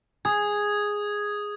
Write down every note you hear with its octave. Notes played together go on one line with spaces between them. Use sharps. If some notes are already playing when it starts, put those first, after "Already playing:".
G#4 D#6 G#6